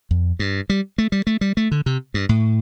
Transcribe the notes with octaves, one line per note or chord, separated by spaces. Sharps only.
F2
G2
G3
A3
G3
A3
G3
A3
D3
C3
G2
A2